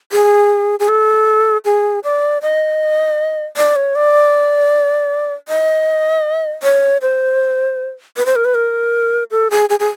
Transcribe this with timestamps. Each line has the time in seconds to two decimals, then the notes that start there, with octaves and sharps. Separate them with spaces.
0.12 G#4
0.80 G#4
0.89 A4
1.65 G#4
2.04 D5
2.42 D#5
3.57 D5
3.76 C#5
3.95 D5
5.48 D#5
6.63 C#5
7.02 C5
8.17 B4
8.26 C5
8.36 A#4
8.45 B4
8.55 A#4
9.31 A4
9.51 G#4
9.70 G#4
9.80 G#4